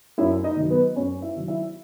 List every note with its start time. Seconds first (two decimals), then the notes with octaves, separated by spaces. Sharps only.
0.18 F#2 E4 E5
0.44 D#4 D#5
0.56 D#3
0.62 F#3
0.70 B3 B4
0.96 F#2 C#4 C#5
1.22 E4 E5
1.35 D#3 F#3
1.48 E4 E5